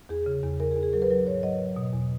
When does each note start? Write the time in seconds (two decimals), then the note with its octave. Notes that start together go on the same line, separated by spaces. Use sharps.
0.09 E2 G#4
0.26 C#3
0.43 E2
0.60 E2 A#4
0.72 G#4
0.76 E2
0.83 G#4
0.93 F#3 A#4
1.02 B4
1.10 F#3 A#4
1.27 G#2 C#5
1.43 F#3 D#5
1.61 F#3
1.76 B2
1.93 E2